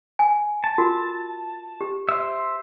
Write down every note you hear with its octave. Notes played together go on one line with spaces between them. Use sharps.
G#5
A5
F4 F#4 A#4
G4
C5 E5